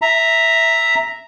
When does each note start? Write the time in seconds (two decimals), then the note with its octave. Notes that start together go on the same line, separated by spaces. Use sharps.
0.02 E5 A#5